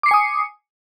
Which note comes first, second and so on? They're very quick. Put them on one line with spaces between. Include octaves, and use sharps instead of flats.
D6 C7 C#7 G#5 D#6